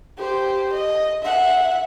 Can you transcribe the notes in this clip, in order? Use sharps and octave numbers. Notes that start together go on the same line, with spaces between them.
G4 C5
D#5
E5 F#5